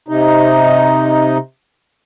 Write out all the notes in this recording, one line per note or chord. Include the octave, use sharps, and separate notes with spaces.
C3 D#4